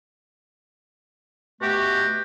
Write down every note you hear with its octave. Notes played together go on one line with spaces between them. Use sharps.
B2 A3 F#4 G4